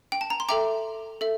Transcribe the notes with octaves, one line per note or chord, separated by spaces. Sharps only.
G5
A5
A#5
C6
A4 E5 G5 A#5 D6
A4 E5